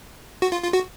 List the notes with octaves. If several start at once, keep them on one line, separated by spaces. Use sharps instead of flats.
F#4
F4
F4
F#4